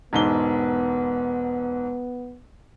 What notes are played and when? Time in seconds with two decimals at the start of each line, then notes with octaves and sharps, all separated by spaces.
0.13 E1 G#2 B3 G7